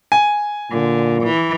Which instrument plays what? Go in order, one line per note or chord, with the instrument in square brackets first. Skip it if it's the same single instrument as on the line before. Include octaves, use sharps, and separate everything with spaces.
[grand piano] G#5
[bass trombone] A#2 [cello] D3
[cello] E3